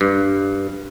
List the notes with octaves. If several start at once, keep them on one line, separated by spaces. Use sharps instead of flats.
G2